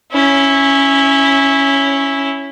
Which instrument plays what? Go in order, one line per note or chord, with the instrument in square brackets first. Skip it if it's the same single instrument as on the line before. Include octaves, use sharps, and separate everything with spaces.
[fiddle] C#4 E4